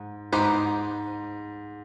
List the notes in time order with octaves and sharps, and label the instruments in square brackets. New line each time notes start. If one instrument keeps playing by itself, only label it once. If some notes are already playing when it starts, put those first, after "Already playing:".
Already playing: [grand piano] G#2
[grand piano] G#2 [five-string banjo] B3 D#4 G4 C5